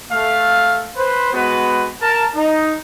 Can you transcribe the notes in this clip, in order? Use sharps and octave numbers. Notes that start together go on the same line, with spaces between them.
A3 F5
B4 C5
G#3 B3 F#4 B4
A#4 A5
D#4